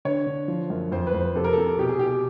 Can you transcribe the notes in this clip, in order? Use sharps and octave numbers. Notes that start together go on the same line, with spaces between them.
D3 C#5
D3
F3
F#2
F2 C5
B4
F2
C5
C3 A4
A#4
C3 A4
B2 G4
G#4
B2 G4